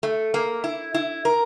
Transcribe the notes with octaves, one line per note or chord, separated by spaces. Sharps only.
A3
A#3
E4
E4
A#4